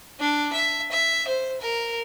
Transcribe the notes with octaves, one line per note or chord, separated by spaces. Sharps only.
D4
E5
E5
C5
A#4